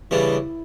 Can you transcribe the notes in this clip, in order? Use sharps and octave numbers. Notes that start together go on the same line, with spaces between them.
C#3 E3 G3 B3 D4 E4